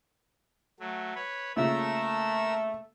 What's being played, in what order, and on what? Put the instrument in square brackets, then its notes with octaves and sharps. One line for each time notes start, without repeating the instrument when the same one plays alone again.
[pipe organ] F#3 A3
B4 C#5
[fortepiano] A#2 C#3 [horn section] A3 [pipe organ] A#4 E6